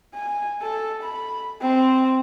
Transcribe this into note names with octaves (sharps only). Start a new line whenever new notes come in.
G#5
A4
B5
C4